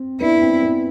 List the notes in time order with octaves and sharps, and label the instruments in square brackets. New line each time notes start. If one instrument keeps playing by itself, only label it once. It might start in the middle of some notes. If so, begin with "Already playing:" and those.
Already playing: [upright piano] C4
[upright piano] B3 D4 [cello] E4
[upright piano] C4
B3